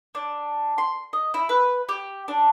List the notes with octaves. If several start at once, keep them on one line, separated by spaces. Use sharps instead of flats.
D4
C6
D#5
E4
B4
G4
D4